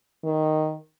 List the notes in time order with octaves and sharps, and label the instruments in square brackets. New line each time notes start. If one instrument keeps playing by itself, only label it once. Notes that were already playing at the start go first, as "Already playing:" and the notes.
[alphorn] D#3